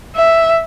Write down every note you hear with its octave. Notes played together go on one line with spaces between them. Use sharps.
E5